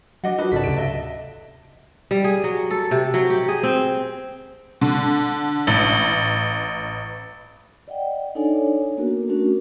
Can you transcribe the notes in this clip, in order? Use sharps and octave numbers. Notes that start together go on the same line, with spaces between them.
F#3 D4 D#5 F#5 D6
D4 D#4 F4 F#4 A#4 B4 D#5
B1 G#2 C#3 F#4 A4 D5 A5 B6
D2 C3 D7
D#5 E5 A5
G3
G#4
F#3
A4
C3
F#3
G4
G#4
C4
D3
A1
D5 D#5 F#5 G5
D4 D#4 A4 C#5 D5 G#5
A#3 B3 D4 F#4 A#4
A3 C#4 D4 F#4 A#4